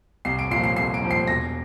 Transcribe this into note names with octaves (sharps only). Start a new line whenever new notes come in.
C2 C7
D7
A#2 C7
F3
C7
C2 C7
D7
A#2 F3
C7
E1 A#6